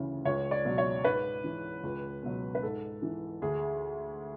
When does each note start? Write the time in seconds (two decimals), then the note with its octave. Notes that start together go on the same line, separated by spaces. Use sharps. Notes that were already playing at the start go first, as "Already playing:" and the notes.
Already playing: D2 C#3 E3
0.25 C#2 C#5
0.51 D5
0.65 B2 F#3
0.78 C#5
1.04 G#2 B4
1.44 E3
1.83 C#2
2.23 B2 F#3
2.55 B4
2.62 G#2 A4
3.02 E3
3.42 D2 G#4